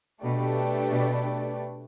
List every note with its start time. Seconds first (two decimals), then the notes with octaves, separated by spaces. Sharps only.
0.23 B2 A3 D4 G4 B4 D5
0.90 B2